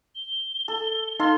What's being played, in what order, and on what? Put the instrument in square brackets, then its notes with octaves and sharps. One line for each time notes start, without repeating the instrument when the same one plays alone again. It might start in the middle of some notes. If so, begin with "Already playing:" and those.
[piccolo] G7
[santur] A4
[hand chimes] D#4 [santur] A4 F5 C6